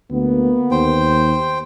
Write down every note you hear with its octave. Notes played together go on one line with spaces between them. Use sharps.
D2 A#3 B3
D#2 C5 G5